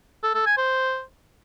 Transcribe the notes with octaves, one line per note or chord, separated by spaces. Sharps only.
A4
A4
G#5
C5